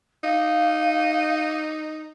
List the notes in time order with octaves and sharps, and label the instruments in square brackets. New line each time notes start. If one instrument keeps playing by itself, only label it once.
[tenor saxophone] D#4 [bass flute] F5